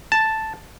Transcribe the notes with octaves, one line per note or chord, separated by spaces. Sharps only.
A5